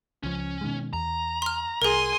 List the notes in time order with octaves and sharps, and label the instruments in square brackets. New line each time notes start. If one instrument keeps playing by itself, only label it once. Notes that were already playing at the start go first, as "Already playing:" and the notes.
[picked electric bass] C#2 F3 [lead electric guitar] C#4
[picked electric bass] B2 D#3 G#3
[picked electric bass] E2 [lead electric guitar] A#5
[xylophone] C6 F6
[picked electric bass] C2 [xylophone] G#4 A#4 [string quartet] G#5 C6 D#6